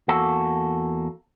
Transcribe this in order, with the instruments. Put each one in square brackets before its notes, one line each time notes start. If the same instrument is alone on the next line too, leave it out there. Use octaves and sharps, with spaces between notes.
[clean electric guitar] E2 A#3 F#4 A4